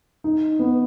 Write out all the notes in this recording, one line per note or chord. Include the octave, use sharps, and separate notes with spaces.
D#4
B3